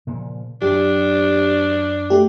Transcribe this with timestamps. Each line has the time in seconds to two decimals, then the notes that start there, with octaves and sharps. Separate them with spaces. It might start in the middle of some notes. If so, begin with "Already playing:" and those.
0.07 A#2 C#3 F3
0.62 F#2 F#3 D4 G4
2.10 A3 G4